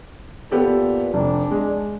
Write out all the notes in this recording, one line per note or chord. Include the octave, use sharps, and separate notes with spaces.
A#2 B3 G4 A4
F1 D4
G#3